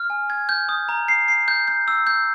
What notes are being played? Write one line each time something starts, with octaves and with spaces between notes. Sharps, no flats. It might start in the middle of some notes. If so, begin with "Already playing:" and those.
Already playing: F6
G#5
G#6
G6
D#6
A#5
C7
C7
G6
G6
E6
G6